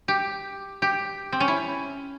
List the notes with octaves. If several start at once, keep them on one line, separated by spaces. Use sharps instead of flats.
G4
G4
C4
C#4
E4